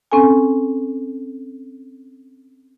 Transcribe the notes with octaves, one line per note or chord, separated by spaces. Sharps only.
C4 C#4 A4 G#5